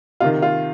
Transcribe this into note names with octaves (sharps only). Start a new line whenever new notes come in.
C3 D#3 F4
F4